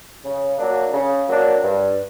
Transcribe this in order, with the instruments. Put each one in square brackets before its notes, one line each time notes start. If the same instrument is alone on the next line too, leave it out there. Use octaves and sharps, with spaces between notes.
[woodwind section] C#3
F#3 A#3 D4
C#3
F#3 A#3 D4
G2